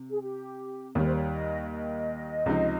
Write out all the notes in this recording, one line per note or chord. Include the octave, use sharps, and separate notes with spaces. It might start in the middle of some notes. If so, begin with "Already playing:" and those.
Already playing: C3
G#4
G4
D#2 D#3 G3 C#5
C5
C#5
D#5
D#5
C#2 C3 F3 C4 D#4